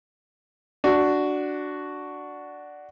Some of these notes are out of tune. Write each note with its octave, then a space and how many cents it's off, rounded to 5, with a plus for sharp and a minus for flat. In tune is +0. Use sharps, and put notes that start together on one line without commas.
D4 +0 F#4 +5